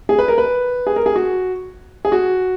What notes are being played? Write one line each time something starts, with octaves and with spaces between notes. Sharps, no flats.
G#4
B4
A#4
B4
G#4
A#4
G#4
F#4
G#4
F#4